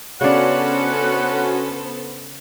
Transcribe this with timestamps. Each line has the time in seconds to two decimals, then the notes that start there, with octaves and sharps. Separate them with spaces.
0.21 C#3 B3 C#4 D4 F#4 A4 C5 F#5